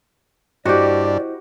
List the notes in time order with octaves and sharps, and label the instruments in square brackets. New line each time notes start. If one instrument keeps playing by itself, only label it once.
[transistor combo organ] G2 D4 [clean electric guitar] E4 C5 D#5 [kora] F#4 G4 [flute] D5